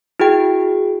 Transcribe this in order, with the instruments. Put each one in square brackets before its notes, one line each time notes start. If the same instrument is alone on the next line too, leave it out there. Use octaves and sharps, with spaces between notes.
[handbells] E4 F#4 G#4 G5